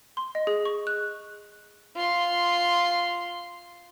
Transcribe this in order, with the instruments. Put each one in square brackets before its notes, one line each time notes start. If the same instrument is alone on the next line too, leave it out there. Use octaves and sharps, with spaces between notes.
[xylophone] C6
D#5
G#4
C#6
F#6
[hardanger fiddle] F4 C6